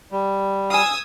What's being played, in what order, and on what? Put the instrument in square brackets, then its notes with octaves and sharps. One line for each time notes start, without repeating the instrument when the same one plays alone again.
[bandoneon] G3
[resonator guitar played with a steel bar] F5 G#5 [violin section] D#6 E6 G#6